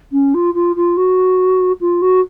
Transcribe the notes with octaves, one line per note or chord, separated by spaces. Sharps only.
C#4
F4
F4
F4
F#4
F4
F#4